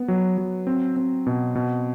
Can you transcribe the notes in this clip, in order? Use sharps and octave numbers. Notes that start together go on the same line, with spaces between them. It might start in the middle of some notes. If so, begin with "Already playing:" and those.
Already playing: B3
F#3
F#3
C4
C4
B2
B2